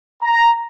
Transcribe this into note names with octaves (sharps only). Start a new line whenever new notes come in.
A#5